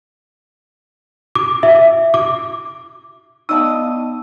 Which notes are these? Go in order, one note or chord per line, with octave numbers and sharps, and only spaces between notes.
D6
E5
D6
B3 D4 D#4 D#5 F5 G5 A5 E6